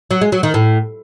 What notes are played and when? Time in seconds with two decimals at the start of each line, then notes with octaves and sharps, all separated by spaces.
0.11 F#3
0.21 G#3
0.32 F#3
0.43 D#3
0.54 A2